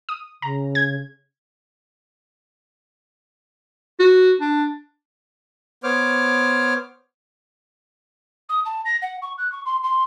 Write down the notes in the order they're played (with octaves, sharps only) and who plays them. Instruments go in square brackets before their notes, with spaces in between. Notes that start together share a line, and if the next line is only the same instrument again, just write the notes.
[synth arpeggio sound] D#6
[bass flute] C#3 [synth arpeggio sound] A#5
[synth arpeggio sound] G#6
[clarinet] F#4
D4
[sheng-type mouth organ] B3 C5 C#5 D6 F6
[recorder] D#6
A5
A#6
F#5
C#6
F#6
C#6
C6
C6